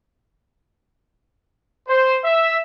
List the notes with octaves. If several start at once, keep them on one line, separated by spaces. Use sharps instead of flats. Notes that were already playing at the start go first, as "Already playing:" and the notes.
C5
E5